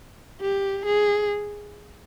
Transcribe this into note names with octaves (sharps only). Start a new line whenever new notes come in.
G4
G#4